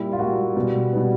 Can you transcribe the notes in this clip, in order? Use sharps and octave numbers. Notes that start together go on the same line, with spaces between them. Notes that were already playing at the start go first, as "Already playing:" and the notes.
Already playing: A#2 G3 A#3 E4
F4
A#2 G3 A#3 F#4
B2 G3 B3
B2 G3 B3